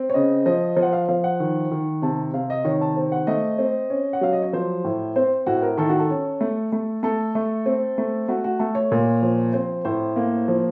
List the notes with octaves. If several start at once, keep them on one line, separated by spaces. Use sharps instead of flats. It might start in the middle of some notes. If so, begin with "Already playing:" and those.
Already playing: C4
C#5
C#3 D#5
F3 D#5
F3
F#5
F5
F3 F5
F#5
D#3
D#3
C3 A5
C3 F5
D#5
D#3 C#5
A5
C4
F#5
A3 D#5
C4
C#4
F#5
F#3 F5
D#5
C#5
F3 C5
A2
C4 C5
A2 F#4
A#4
D#3 A4
F#4
A4
C#4
A3
A3
A3 A4
A3
C4
A3
A3 F#4
F#4
A3 A4
C#5
A#2
F3
C4 C5
A2 C5
A#3
F3